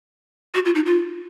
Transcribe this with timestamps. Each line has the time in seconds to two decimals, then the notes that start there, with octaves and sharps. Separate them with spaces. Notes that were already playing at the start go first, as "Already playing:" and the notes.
0.54 F#4
0.65 F4
0.75 D#4
0.86 F4